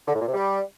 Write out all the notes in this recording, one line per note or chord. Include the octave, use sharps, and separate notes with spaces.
D3
A2
A#2
C3
G3